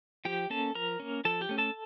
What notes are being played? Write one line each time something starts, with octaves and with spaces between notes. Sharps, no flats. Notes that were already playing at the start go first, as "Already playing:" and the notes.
F3 G4 G5
A#3 C#4 A4 A5
F3 A#4 A#5
A#3 C#4
F3 A4 A5
G4 G5
A3 C#4
A4 A5